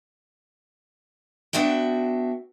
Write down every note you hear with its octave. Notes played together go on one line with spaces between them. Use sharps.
B3 D4 F#4 E5 G5